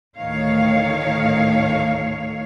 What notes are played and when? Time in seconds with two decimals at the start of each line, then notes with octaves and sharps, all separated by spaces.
0.18 D2 A2 D#3 C#5 F5